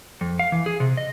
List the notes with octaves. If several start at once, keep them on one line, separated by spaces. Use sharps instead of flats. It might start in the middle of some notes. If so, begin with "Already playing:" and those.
F2
F5
E3
G#4
C3
D#5